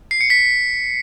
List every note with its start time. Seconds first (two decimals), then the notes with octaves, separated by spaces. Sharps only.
0.11 C7
0.21 C#7
0.30 B6